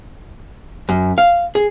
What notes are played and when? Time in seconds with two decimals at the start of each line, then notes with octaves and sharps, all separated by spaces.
0.89 F#2
1.18 F5
1.55 G#4